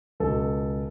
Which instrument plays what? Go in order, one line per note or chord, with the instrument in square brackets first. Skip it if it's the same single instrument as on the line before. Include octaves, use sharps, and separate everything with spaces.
[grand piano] C#2 B2 A4